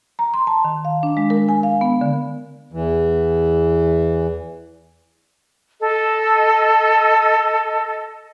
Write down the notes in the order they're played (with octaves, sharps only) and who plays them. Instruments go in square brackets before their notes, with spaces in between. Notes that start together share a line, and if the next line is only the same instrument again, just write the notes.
[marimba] A#5
C6
A5
D#3
F5
D4
G#3
A#4
G#5
F5
B3
D3
[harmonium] E2 E3
[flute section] A4 D#5